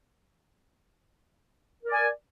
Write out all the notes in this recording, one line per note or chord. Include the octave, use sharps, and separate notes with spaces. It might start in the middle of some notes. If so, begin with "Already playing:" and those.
A#4 D5 G#5